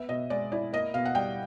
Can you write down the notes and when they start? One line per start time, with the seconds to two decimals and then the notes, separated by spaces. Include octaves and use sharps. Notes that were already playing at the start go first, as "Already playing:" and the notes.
Already playing: B3 E5
0.09 B2 D#5
0.30 G#3 D5
0.52 E4 D5
0.72 A#3 D#5
0.94 B2 F5
1.05 F#5
1.15 G3 G5